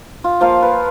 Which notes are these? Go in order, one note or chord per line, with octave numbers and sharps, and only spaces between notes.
F4
F3 A#3 F5
B4